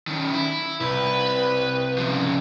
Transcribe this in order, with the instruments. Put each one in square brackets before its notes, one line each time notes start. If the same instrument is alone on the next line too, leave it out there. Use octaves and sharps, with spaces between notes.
[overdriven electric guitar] D#3 C#4
E4
[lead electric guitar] C2 [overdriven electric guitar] B4
[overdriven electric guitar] C#3 F3